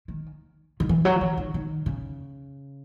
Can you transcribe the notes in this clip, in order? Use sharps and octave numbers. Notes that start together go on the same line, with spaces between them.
D#3
D#3
E3
F#3
E3
D#3
D#3
C#3